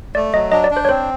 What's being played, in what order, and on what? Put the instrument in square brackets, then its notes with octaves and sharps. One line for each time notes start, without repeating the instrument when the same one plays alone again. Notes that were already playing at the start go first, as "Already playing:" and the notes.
[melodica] A3 [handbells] D5
[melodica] F#3 [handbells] D#5
[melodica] D4 [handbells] D#5
[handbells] D5
[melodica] D4
[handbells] C5
C#5
[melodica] C4 [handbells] C5